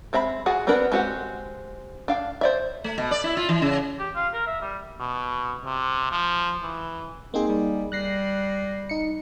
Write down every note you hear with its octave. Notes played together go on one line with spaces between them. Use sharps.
G#3 C4 E5 A#5 B5
F4 F#4 G#4 F#5
B3 C4 D4 A#4 B4
G#3 C4 F#4 G4 F#5
D4 F5 G5
C5 D5 E5
A3
B2
D5
E4
F4
E3
C#3
G4
F4
A#4
E5
G3
B2
C3
F3
E3
A#3 C4 D#4 G#4
G3
G3 F#6 A#6 C7
D#4 C#7